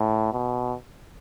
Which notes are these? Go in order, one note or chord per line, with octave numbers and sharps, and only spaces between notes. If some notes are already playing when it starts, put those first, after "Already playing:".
Already playing: A2
B2